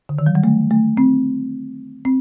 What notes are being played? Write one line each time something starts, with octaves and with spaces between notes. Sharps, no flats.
D3
D#3
F#3
G3
A3
A3
C4
C4